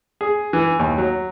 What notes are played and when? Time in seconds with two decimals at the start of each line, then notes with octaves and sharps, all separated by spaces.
0.21 G#4
0.53 E3
0.79 D#2
0.98 F#3